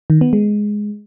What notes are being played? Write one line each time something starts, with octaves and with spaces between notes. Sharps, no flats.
D#3
B3
G#3